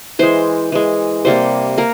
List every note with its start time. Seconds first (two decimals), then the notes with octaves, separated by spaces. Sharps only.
0.19 E3 G#3 C5
0.72 E3 G#3
1.25 C3 G3 A#3 C5
1.78 A#3 A#4